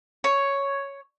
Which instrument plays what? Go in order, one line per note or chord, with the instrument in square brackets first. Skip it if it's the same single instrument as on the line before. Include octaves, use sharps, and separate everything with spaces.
[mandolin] C#5